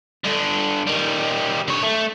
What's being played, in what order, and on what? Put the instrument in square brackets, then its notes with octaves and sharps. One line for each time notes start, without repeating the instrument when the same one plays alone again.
[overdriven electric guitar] G2 D3
D#3 G3
D3 C#5
A3